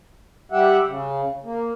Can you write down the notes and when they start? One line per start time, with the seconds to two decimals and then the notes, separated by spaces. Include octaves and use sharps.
0.52 G3 G4 E5 F#5
0.87 C#3
1.44 A#3